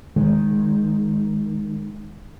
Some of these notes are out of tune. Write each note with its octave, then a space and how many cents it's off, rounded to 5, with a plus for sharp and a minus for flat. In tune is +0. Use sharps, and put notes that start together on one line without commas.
D#3 +0 G#3 +0